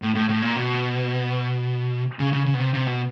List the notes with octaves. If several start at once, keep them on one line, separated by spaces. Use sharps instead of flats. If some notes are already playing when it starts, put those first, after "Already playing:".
A2
A2
A2
A#2
B2
C#3
C#3
C#3
B2
C3
C3
B2